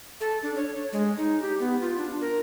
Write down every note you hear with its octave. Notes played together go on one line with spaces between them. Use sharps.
A4
D4
C#5
G#3
D#4
G4
B3
F4
D4
A#4